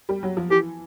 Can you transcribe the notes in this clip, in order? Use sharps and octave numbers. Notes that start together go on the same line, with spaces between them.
G3
F#3
F3
E3 G4